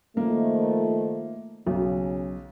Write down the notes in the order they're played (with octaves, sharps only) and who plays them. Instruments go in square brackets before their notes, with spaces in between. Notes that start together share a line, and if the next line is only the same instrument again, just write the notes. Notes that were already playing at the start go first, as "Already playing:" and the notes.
[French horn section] D#3 F3 A3 [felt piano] A#3
[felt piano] B1 [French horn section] C#3